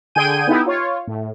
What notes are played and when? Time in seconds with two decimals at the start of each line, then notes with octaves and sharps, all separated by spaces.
0.15 D3 G#4 G5 G#5 G6 D#7
0.47 B3 D#4 E4 G4
0.66 F4 C#5
1.07 A2